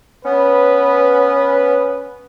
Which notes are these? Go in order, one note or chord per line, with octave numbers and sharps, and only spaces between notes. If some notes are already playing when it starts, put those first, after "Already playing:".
B3 C#4 B4